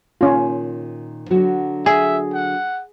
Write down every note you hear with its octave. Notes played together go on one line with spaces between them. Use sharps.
A#2 D#3 C#4 F4
D3 F#3 F#4
G#4 E5
F#5